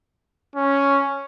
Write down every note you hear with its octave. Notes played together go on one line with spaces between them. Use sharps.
C#4